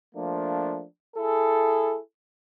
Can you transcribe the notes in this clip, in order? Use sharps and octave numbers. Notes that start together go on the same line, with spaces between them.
F3 A3 A#3 D4
E4 G#4 A4